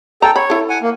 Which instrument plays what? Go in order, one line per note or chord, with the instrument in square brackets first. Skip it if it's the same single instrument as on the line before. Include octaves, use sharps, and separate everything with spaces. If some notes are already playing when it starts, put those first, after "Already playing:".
[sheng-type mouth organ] A4 G5 [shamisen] A#5
[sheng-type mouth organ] C#5 [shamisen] B5
[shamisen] E4 A4
[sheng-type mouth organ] F#5 G#5
A#3